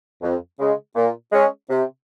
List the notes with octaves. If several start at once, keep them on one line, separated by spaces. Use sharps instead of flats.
F2
C#3 G#3
A#2
G#3 C#4
C3